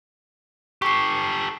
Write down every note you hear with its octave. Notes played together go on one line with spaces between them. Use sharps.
G4 A4 C#6 C7